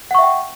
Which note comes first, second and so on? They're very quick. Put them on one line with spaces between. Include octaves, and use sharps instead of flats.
F#5 C#6 E5 G5